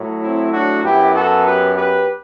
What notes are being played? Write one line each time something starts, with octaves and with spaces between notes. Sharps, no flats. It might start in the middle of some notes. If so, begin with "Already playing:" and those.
Already playing: A2 F#3
C4 E4
D4 F#4
F#2 F#3 B3 E4 G4
F#4 A4
G4 B4
G4 B4